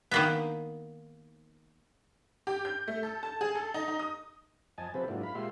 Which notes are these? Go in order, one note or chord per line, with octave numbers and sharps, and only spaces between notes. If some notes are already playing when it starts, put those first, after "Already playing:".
D#3 A#3 B3
G4
G6
A3
A4
A5
G#4
A4
D#4
D#4
D#6
F2 D#5 G#5 A5
C3 F3 C4 G4 A4 B4
G#2 F#3 A#3 D4 E4 F4
F5 B5
A#2 G#3 F4 G4 E5 C6